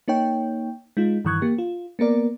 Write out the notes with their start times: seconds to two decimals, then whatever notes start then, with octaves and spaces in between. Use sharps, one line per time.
0.08 A#3 D#4 C#5 G5
0.97 G#3 D#4 F4
1.25 G2 D#3 E3 C#6 F#6 G#6
1.42 A#3 G4
1.58 F4
1.99 A#3 B3 A#4 D5